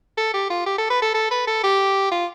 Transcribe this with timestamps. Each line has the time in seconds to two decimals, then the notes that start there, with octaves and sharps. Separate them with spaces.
0.17 A4
0.34 G4
0.50 F4
0.66 G4
0.78 A4
0.90 B4
1.02 A4
1.14 A4
1.31 B4
1.47 A4
1.64 G4
2.11 F4